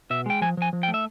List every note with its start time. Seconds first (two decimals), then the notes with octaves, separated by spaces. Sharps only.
0.10 B2 E5
0.26 G#3 G5
0.41 F3 G#5
0.57 F3 G#5
0.73 F3
0.83 G5
0.88 A3
0.94 E5